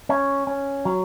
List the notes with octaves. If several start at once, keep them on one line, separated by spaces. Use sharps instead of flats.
C#4
C#4
F#3